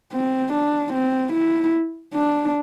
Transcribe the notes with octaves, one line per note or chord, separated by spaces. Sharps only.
C4
D4
C4
E4
D4